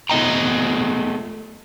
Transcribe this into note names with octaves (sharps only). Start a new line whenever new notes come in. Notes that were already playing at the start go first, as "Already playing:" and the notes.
A3 B3 F4 D#5 G5 A#5